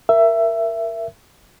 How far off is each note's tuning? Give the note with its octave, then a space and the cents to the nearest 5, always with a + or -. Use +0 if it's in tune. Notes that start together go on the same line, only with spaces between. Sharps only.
A#4 +0 E5 +15